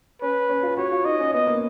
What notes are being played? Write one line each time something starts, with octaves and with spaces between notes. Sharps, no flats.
C#4 B4
C#4
F4
F#4 C#5
F4
D#4 D#5
C#4
B3 D#5
A#3